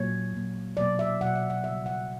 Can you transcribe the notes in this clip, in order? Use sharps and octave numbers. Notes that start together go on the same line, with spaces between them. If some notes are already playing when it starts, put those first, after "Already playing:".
Already playing: A#2 F#3 A#3 C#5
A#2 F#3 A#3
B2 F#3 A#3 D5
E5
B2 F#3 A#3 F#5
E5
F#5
C#3 G3 B3 E5
F#5